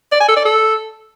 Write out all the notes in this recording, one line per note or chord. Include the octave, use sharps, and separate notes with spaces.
D5
G#5
A4
D5
A4